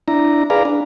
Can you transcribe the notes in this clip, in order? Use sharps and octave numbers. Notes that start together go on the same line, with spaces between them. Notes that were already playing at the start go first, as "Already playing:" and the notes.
D4 E4 A#5
G#4 B4 D5 F5 A#5
D4